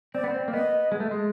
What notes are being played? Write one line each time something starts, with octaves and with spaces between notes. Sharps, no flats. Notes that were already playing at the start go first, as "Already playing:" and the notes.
C4 D5
B3
C4
A#3
B3 D#5
G#3
A3
G#3